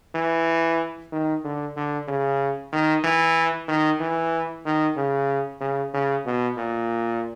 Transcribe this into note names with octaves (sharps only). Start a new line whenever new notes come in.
E3
D#3
D3
D3
C#3
D#3
E3
D#3
E3
D#3
C#3
C#3
C#3
B2
A#2